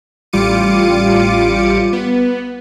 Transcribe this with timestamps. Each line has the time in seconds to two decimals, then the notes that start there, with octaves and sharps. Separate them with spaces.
0.33 A1 G3 F4 D6 C#7 D#7
1.93 B3